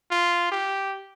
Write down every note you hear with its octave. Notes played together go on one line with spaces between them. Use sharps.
F4
G4